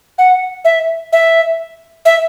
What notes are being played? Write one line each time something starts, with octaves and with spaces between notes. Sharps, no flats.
F#5
E5
E5
E5